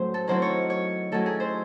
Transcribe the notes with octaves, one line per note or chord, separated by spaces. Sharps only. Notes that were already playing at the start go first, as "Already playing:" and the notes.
Already playing: A2 F#3 A3 C#4 C5
A4
D#3 F#3 C4 E4 C5
C#5
C#5
D#3 F#3 A3 C#4 E4 A4
G#4
C5